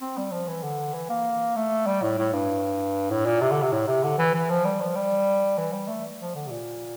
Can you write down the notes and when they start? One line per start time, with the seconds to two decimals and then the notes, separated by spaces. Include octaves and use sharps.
0.01 C4
0.17 G3
0.32 F3
0.48 E3
0.63 D3
0.94 E3
1.10 A#3
1.56 A3
1.87 G3
2.02 A2
2.18 A2
2.33 G2
3.11 A2
3.26 A#2
3.41 C3
3.51 D3
3.63 C3
3.72 A2
3.87 C3
4.03 D3
4.19 E3
4.35 E3
4.50 F3
4.65 G3
4.80 F3
4.95 G3
5.58 E3
5.73 G3
5.88 A3
6.20 F3
6.35 D3
6.47 C3
6.51 A#2